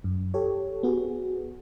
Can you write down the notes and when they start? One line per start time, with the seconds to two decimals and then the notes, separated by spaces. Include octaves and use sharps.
0.04 F#2
0.34 G4 A4 C#5
0.83 B3 F#4 G#4